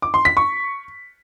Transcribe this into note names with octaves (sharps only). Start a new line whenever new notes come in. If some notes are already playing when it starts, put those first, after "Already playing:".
D6
C6
B6
C#6